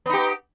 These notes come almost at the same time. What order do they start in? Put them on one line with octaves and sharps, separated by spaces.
B3 D#4 G4